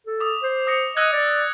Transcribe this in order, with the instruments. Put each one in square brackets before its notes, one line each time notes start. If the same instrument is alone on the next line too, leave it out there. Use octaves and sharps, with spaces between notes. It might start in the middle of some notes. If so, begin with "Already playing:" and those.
[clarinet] A4
[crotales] D6 D#6
[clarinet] C5
[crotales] D#6 A#6 C#7
[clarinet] D#5 [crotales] E6 F#6 G#6
[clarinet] D5